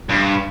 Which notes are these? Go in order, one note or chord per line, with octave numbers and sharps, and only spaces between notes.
G2